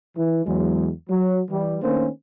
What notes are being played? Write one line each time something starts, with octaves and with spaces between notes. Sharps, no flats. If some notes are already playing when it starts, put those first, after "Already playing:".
E3
E2 F#3 G#3
F#3
E3 G3
D#3 A3 A#3 C#4 D4 C5